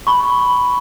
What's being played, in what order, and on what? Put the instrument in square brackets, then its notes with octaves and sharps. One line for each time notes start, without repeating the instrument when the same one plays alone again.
[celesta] B5 C#6